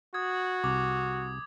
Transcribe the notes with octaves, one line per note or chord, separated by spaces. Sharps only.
F#4 D#6 G#6
C2 D6